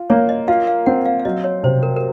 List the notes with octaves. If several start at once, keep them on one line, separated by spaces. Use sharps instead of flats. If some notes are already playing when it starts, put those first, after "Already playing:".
Already playing: F4
A#3 C#5
D#5
F4 F5
F5
C4 F#5
F5
F5
F#3 D#5
C#5
C3 C5
A#4
A#4